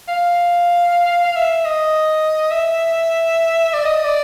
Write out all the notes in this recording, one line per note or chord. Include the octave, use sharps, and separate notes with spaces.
F5
E5
D#5
E5
D5
D#5
D5